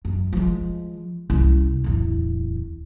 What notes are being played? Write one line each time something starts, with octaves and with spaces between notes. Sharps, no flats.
F#2
F3 G#3
C2 C#4
D1 E2